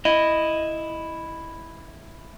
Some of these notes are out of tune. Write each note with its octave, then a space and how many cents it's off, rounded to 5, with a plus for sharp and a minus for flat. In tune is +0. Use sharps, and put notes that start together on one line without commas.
E4 +0 D#5 +0